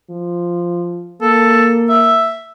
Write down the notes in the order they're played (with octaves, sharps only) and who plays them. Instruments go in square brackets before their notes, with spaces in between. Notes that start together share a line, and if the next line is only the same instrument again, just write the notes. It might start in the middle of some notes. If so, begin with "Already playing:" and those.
[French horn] F3
[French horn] A#3 [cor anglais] A4
[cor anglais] E5